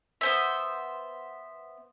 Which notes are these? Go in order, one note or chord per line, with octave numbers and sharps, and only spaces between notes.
B3 C5 E5